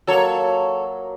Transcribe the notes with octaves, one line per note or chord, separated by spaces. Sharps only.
F#3 A#3 A4 C#5